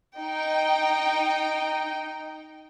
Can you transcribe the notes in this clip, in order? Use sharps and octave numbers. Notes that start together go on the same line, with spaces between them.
D#4 G5